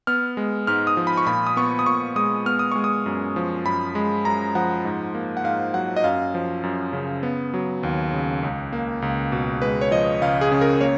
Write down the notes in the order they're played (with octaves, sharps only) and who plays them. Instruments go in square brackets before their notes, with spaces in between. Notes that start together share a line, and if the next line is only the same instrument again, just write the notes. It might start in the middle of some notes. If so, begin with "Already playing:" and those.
[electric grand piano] B3 F6
G#3
G#2 F6
D#6
F3
B5
C#6
A#2 B5
D#6
B3 C#6
D#6
A#2 C#6
G#3 D#6
B3 F6
D#6
G#3 C#6
D#6
F#2
F3
F#2 B5
G#3
F#2 A#5
F3 F#5
G#2
A#3
F#5
G#2 F5
F#3 F#5
D#5
F#2 F5
F3
F#2
C#3
B3
F#3
D#2
C#3
C#2
A#3
C#2
B2
G#3 B4
C#5
F3 D#5
C#2 F5
G#4
C#3
A#4
A#3 C#5